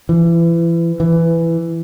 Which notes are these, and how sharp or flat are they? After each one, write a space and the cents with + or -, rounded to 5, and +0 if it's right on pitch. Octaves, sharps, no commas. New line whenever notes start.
E3 +30
E3 +10